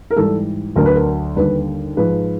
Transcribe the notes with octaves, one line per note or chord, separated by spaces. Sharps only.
A#4
G#2 E3 G3 A4
D2 D3 F#3 A#4
B4
A#4
D#2 D3 G3 B4
G#2 F3 G#3 B4